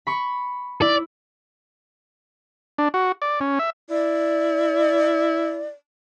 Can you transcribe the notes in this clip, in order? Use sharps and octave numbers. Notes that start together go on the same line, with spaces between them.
B5 C#6
E4 D5
D4
F#4
D5
C#4
E5
E4 D5